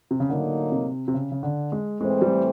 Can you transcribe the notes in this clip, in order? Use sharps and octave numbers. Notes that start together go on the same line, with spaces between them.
C3
C#3
A2 D3 F#3 A#3 D#4
C3
C3
C#3
C#3
D3
G#3
A2 E3 G#3 A3 C4
G3